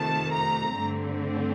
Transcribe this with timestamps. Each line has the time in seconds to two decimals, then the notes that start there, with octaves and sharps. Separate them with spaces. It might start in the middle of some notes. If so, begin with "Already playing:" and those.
Already playing: F2 C3 D#3 A3 A5
0.32 A#5
0.78 G2 D3 A3 C4